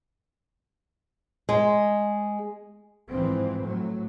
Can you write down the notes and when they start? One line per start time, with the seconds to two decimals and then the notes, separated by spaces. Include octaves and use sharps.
1.49 G#3
3.10 G#2 E3 F3 C4
3.61 A2 F#3